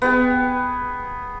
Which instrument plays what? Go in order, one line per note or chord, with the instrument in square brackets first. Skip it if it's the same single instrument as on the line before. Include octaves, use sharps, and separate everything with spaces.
[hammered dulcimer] B3 G#4 G5